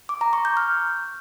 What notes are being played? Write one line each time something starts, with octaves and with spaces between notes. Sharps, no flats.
D6
A#5
C#6
G6
F6